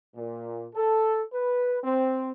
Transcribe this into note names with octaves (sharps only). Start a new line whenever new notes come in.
A#2
A4
B4
C4